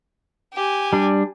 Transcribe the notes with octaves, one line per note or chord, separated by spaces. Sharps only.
G4 G#5
G3 D4